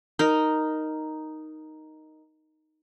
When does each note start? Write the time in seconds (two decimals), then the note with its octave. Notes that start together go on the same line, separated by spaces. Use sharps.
0.19 D#4 A#4